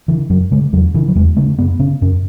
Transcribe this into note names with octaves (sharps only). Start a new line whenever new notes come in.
C#3 E3
F#2 F#3
C#3 G#3
E2 F#3
C#3 E3
F#3
E2 G#3
C#3 A3
F#2 B3
C#3 C#4
F#2 C#4